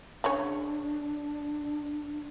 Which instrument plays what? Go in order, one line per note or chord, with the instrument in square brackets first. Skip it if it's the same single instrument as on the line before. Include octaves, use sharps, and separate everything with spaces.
[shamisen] C#3 G#4 C#5 [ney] D4